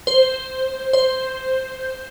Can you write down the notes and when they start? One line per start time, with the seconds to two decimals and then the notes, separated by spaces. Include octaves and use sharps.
0.07 C5
0.93 C5